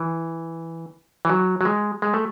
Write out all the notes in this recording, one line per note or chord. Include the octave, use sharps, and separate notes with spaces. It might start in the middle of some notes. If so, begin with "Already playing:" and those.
Already playing: E3
E3
F#3
F#3
G#3
G#3
A3